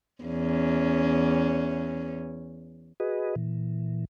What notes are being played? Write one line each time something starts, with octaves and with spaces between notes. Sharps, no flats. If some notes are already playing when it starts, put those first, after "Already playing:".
E2 C#4
F#4 G#4 B4 D#5
A#2 E3